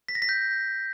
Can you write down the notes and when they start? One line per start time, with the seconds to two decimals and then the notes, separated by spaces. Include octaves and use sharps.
0.09 B6
0.15 A#6
0.22 B6
0.29 G6